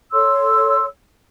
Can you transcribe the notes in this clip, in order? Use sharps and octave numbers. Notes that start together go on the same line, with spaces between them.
A4 C#5 C6 E6